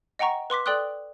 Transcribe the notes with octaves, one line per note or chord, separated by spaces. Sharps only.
D#5 F#5 G5 A#5 C#6
B4 C6 D6 B6
A4 D5 G5 C6 D#6 F#6